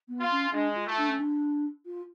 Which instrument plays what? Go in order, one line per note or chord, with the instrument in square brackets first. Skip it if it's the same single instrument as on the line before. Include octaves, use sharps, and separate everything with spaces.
[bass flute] B3
[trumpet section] F4
[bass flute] C#4
[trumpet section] G#3 [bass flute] D4
[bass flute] F4
[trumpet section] A3
[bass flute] D4
C#4
D4
F4